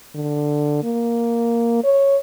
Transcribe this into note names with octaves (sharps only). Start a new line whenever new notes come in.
D3
A#3
C#5